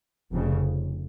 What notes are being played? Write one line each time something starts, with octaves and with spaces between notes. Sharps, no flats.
F1 F2 C#3